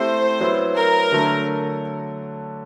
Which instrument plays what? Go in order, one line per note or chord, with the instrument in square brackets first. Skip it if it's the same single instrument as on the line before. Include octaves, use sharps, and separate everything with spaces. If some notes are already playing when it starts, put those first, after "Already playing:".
Already playing: [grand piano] A3 C4 E4 G4 [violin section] C5
[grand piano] F#3 B3 E4
[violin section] A#4
[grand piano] D3 F#3 A3